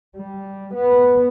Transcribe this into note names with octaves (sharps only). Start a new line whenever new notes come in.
G3
B3